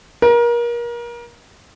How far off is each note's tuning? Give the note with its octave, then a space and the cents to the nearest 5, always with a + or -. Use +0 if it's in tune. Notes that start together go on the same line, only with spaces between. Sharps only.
A#4 +30